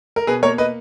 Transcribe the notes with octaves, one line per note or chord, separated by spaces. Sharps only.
A#4
B2 G#4 B4
A#3 A#4 C#5
B4 D#5